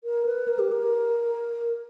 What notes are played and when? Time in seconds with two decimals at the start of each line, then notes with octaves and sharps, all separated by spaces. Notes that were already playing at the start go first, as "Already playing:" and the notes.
0.04 A#4
0.26 B4
0.48 A#4
0.59 G4
0.72 A#4